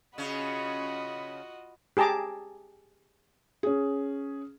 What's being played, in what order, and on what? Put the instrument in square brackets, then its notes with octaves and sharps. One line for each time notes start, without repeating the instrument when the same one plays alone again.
[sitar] C#3 C#4 [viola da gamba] F4 F#4 D#5 [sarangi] B5
[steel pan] G4 G#4 A5 A#5 D6
[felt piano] C#4 G#4